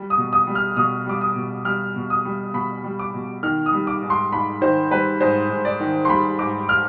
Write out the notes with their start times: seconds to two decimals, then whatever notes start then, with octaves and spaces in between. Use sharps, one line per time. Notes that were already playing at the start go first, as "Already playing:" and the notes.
Already playing: G3
0.10 D#6
0.17 B2
0.33 D#6
0.47 G3
0.55 F6
0.77 B2 D#6
1.07 G3 D6
1.21 D#6
1.36 B2
1.65 G3 F6
1.96 B2
2.10 D#6
2.25 G3
2.54 B2 B5
2.84 G3
2.99 D6
3.14 B2
3.43 D#3 F6
3.66 D#6
3.73 G3
3.87 D6
4.02 G#2
4.10 C6
4.32 G#2 B5
4.61 D#3 C5
4.91 G3 B4
5.21 G#2 C5
5.49 G#2
5.65 D5
5.80 D#3
6.05 C6
6.09 G3 B5
6.39 G#2 D6
6.69 F6